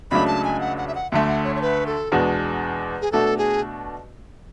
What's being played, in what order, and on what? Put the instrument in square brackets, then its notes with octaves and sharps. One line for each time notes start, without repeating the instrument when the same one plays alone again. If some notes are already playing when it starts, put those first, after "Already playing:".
[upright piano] C#2 C#3 F#3 A3 D4 [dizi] B5
[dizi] A5
G#5
F#5
F#5
E5
F#5
[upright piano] D2 D3 A3 [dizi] E5
[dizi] F#5
C#5
C#5
B4
A4
[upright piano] E2 B2 G#3 D4 F#4
[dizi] G#4
[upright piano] B2 A3 D4 F#4 [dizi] A4
[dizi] G#4